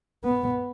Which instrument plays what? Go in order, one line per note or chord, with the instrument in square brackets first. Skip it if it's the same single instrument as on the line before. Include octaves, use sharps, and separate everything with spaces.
[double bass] B3